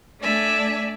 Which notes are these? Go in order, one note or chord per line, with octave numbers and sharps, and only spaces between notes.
A3 D4 D5 E5 G#5